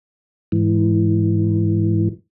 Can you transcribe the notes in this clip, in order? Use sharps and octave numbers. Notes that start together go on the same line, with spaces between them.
G#2 E3